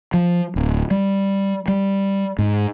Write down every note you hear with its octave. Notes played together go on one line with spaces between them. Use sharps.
F3
D1
G3
G3
G#2